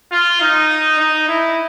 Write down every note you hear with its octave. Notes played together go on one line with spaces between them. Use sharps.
F4
D#4
D#4
E4